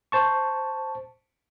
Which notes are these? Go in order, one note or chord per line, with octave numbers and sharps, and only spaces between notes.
C5 A5 C#6